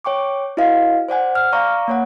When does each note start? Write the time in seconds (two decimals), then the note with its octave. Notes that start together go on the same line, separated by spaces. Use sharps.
0.05 C#5 G5 C#6 D6
0.57 E4 F#4 B4 D#5 F5
1.08 C5 D5 F#5 G#5
1.35 F6
1.53 D5 F5 A#5 C#6 D6
1.88 A#3 C#5 F#5